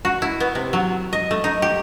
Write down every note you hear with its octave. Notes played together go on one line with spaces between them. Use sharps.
F#4
E4
B3
C3
F#3
D#5
A3
D#4
G4